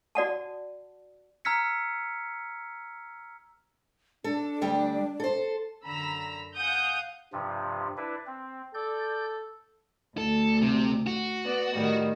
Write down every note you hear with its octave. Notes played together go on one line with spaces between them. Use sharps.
F#4 D5 F#5 A5
A#5 E6 F6 G#6 B6 C#7
D4 A4
D2 G3 G4
A4 C5
F#2 D3 A#5 B5 E6
F5 F#5 G#5 D#6 G6
G2 C3 F3
D4 E4 B4
C4
A4 D5 G6
D2 A4
C3
F#4
B3 D5
A2 D#3 G3